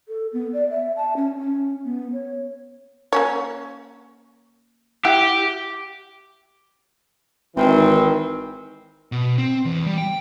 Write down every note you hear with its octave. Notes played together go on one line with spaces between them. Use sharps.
A4
B3
D5
E5
A5
C#4
C#4
B3
C#5
A#3 C#4 C#5
E4 G4 E5 F#5
G#1 D#3 E3 C4
B2
C4
E2
G3
G5